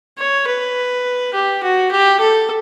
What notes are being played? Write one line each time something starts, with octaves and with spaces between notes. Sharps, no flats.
C#5
B4
G4
F#4
G4
A4